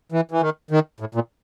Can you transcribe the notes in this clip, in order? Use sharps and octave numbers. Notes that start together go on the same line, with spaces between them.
E3
E3
D#3
D#3
A2
A#2